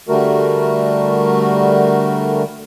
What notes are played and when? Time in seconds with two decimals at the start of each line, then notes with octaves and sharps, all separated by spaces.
0.09 D3 G3 A3 F#4 A#4